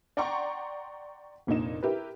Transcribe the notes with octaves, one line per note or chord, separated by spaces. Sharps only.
D5 F#5 G5 A#5 C6 C#6
F1 A#2 D4 D#4 E7
E4 G4 A#4 B4